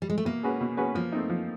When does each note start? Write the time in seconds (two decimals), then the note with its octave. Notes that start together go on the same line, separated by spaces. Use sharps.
0.02 G3
0.10 G#3
0.18 A3
0.25 B2 A#3
0.43 G#3 C#4 F#4 B4
0.61 B2
0.77 G#3 C#4 F#4 B4
0.95 F3 A#3
1.12 A3 C4 D#4
1.29 F3